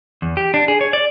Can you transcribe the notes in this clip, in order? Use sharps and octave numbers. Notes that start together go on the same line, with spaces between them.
E2
G4
D4
G#4
C#5
D5